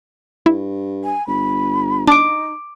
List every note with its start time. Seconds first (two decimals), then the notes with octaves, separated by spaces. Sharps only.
0.46 G2 E4
1.04 G#5
1.27 G1 B5
2.08 D4 D#4 D6 D7